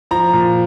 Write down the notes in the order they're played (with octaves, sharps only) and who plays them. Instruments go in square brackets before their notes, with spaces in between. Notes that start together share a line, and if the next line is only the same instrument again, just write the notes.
[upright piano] F3 A#5
A#2